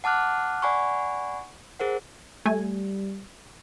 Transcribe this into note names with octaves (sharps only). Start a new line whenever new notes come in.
F#5 A5 D6 F6 F#6
D5 F#5 G#5 B5 C#6
G#4 A#4 C5 F#5
G3 A3 G#5